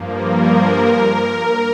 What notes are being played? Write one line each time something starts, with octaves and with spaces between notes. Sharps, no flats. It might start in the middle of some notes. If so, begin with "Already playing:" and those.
Already playing: G2 F3 A#3
A#4